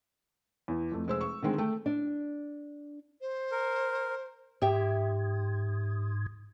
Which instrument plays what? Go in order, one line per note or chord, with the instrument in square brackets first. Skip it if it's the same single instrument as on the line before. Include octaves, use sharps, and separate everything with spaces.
[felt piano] E2
F2 A3
F1 G#3 C5 E6
C#6
D3 D#3 G#3 C4
A3 G5
[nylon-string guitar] D4
[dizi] C5
[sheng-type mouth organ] A#4
[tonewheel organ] G#2 [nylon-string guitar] G4 E5 G5